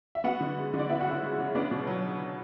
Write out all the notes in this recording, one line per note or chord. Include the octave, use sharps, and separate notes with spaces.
E5
B3 F#4 F#5
D3
G#3
D3
D5
B3 E4 E5
F#4 F#5
C#3 E4 E5
G#3
C#3
B3 D4 D5
B2
F#3